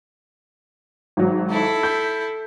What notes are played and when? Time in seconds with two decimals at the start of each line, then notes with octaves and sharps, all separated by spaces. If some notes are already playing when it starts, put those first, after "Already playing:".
1.17 G#1 F#3
1.50 E4 A4
1.83 G6 B6